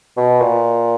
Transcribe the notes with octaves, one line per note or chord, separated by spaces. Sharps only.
B2
A#2